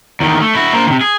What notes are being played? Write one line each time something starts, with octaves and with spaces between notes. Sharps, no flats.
E2 D#3
A3
E4 F#4
A#3 C5
C3 D#3
G#4